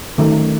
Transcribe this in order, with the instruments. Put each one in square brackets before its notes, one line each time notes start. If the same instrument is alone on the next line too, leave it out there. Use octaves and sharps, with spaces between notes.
[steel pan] D#3 F#3 A3 C#4